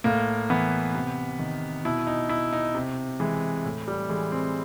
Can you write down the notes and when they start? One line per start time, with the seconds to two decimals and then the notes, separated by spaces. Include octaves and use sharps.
0.04 A2 A#3
0.50 E3 B3
0.95 C3
1.39 D#3
1.85 B2 E4
2.07 D#4
2.29 E4
2.53 D#4
2.75 C3
3.20 E3 G#3
3.65 A2
3.88 G3
4.09 E3 G#3
4.32 C4